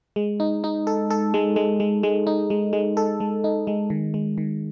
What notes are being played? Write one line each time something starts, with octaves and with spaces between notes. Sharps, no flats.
G#3
D#4
D#4
A4
A4
G#3
G#3
G#3
G#3
D#4
G#3
G#3
A4
G#3
D#4
G#3
D#3
G#3
D#3